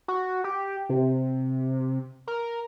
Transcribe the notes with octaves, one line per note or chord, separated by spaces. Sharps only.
F#4
G4
C3
A#4